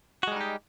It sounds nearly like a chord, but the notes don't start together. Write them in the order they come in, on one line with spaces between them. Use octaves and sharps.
F#4 G#3 G3 D#4 G4